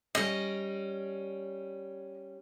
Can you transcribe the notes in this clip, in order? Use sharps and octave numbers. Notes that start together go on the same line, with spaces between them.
G3 C#4 D#5